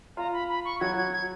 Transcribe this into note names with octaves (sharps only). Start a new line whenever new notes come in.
F4 A#5
B5
B5
C#6
F#3 F#4 G#6
G#6
G#6